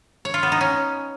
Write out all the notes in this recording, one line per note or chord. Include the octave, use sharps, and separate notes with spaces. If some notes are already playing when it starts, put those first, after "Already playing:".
C#5
F4
B3
D#4
C#4